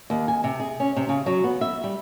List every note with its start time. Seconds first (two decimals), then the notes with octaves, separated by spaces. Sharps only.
0.10 D#2
0.28 G#5
0.44 C3
0.59 G#4
0.80 C#4
0.96 C3
1.09 C#3
1.26 F#3
1.44 B3
1.61 E5
1.84 G3